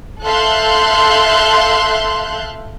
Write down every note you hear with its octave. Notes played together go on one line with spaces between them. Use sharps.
A4 E5 F5 C6 F#6 G6